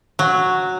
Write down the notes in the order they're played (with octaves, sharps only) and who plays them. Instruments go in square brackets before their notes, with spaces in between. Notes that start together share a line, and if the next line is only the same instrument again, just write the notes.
[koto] F#3